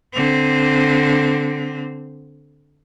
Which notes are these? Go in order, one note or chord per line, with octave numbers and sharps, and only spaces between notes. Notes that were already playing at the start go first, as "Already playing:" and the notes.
D3 C4